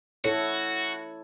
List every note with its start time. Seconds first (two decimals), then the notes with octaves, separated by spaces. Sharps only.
0.25 E4 F#4 A4 C#5